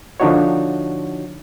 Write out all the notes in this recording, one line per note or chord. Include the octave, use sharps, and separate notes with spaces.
D3 F3 D4 D#4 F#4 C#5